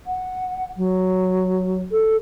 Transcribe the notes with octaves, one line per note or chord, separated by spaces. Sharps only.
F#5
F#3
A4